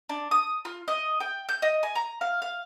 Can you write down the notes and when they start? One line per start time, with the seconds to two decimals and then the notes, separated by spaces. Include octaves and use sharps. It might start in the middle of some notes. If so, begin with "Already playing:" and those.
0.09 D4
0.31 D#6
0.65 F4
0.88 D#5
1.20 G5
1.49 G6
1.62 D#5
1.83 G#5
1.95 A#5
2.21 F5
2.42 F5